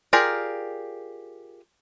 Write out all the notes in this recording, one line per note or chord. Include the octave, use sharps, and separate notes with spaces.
F4 G4 G#4 A#4 D5